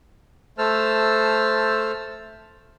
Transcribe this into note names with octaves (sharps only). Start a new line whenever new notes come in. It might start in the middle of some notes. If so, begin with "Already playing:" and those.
A3 C5 A5 E6 F6